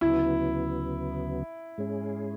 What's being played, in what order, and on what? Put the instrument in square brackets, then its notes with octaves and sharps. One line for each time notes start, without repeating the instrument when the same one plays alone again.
[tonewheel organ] D2 C#3 F#3 B3 [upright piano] E4
[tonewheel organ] G#2 G#3 C#4 G#4